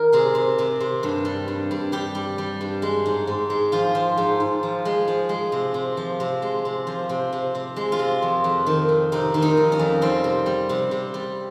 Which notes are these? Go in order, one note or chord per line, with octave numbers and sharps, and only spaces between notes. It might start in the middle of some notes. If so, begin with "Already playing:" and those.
Already playing: D#3 A#4
C3 G#4
C3
C3
C3
G2
G3
G2
G2
G3 G4
G3
G3
G2
G#3
G#2
G#2
G#3
F3 F4
F3
G#2
G#2
F3
G#3
F3
G#3
C3
C3
F3
C3
G#3
C3
F3
C3
C3
C3
G#3
F4
C3
F2
F2
D#3
C3
C3 D#4
D#3
D#4
F2
C#4
F2
G3 C4
C3
G3
C3
C3
G3